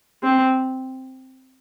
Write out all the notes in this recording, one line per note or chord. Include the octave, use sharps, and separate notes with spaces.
C4